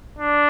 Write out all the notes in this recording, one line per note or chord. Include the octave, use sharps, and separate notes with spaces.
D4